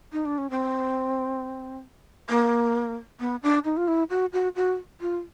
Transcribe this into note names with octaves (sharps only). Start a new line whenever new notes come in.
D#4
D4
C#4
C4
A#3
B3
D4
D#4
F4
E4
F#4
F#4
F#4
F4